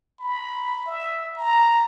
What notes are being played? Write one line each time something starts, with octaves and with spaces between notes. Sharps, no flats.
B5
E5
A#5